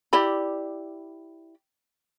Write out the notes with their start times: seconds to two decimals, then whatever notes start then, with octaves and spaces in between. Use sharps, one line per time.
0.13 E4 G4 D5 B5